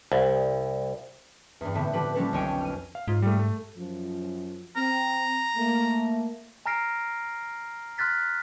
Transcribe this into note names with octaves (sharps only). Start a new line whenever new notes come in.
C2
E2 G2
A2 D3 B3 C4 E4
D3 F3 D4 G4 B4
F3 G3 A#3 C#4 A4 B4
B1 F2 C#5 G5 G#5 D7
F6 D#7
F5
G#2 D#4 F4
G3 A3
A3
F#2 F3
C4 A#5
A3 A#3
G#5 A#5 F6 A#6 C7 D7
C6 F6 F#6 A6 B6